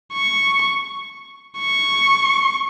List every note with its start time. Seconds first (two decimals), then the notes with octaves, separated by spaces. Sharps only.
0.14 C#6
1.59 C#6